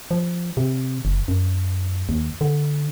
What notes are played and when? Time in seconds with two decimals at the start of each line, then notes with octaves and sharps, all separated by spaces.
0.11 F3
0.57 C3
1.05 F#1
1.28 F#2
2.09 D#2
2.41 D3